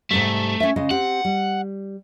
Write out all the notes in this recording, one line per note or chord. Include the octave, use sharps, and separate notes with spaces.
G#2 C3 G3 A3
C#4 E5
C#3 G#3 D#5
C4 G4 F#5
G3